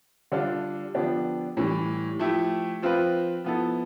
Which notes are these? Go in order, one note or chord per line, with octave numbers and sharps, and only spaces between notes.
D3 G3 D4 F4
D3 F3 B3 D4 G4
A2 E3 G3
F3 A3 E4 G4
F3 C4 F4 B4
F3 B3 E4 A4